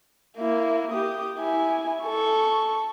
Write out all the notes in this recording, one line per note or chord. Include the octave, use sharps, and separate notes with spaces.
A#3 E4
G4 D#6
E4 G#5
A4 C#6